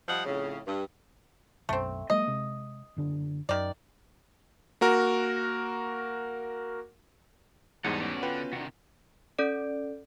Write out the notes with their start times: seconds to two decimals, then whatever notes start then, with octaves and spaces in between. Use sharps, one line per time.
0.08 F3 G3 D#5 F#5
0.26 F2 A2 C#3
0.66 G2
1.69 B1 F#2 A3 C4
2.10 F#3 G#3 A#3 D#5
2.27 C3 G#3
2.96 F#1 D3 D4
3.49 F#2 D#3 D5
4.81 A#3 F#4 A#4
7.85 E2 G#2 G3 A4 C5 C#5 D#5 F#5
8.00 A3 B3 C#4 F#4 D5
8.23 D3 F4 B4 G5
8.53 C3 D#3 D4 F#4
9.39 C#4 A4 D5 D7